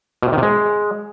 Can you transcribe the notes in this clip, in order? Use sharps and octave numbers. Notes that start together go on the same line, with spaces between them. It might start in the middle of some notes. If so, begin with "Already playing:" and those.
B2
C3
D#3
C3
G#3